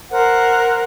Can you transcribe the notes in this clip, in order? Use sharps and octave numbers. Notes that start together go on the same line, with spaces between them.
A#4 C5 F#5